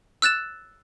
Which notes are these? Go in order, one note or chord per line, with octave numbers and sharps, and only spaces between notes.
E6 F#6 A6 E7